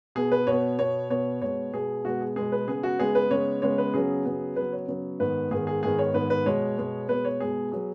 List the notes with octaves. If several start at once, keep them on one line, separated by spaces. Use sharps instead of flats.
B2 B3 G#4
B4
B2 B3 C#5
B2 B3 C#5
B2 B3 C#5
B2 G#3 B3 C#5
B2 G#3 B3 G#4
B2 G#3 B3 F#4
G#4
B2 G#3 B3 G#4
B4
C#3 G#3 B3 G#4
F#4
C#3 G#3 B3 G#4
B4
C#3 G#3 B3 C#5
C#3 G#3 B3 C#5
B4
C#3 F#3 B3 G#4
C#3 F#3 B3
C#3 F#3 B3 B4
C#5
C#3 F#3 B3
G#2 D#3 B3 B4
G#2 D#3 B3 G#4
G#4
G#2 D#3 B3 G#4
C#5
G#2 D#3 B3 B4
B4
B2 G#3 B3 C#5
B2 G#3 B3
B2 G#3 B3 B4
C#5
B2 G#3 B3 G#4
F#3 B3 G#4